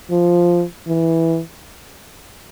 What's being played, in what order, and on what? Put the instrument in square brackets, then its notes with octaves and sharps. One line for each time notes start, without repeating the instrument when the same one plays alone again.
[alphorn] F3
E3